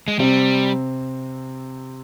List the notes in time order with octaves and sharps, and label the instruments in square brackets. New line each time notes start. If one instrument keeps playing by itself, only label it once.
[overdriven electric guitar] G#3
[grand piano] C3 C4 [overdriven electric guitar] G3